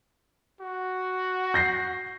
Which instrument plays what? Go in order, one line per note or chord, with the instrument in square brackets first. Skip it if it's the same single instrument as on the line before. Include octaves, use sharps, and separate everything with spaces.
[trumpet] F#4
[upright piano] G6 A#6 C7